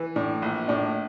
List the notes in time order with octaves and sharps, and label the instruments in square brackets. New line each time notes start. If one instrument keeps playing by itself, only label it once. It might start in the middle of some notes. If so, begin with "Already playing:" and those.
Already playing: [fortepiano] E3
[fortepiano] A2 [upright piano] D4
[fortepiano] A#1
[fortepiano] A2 [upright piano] D4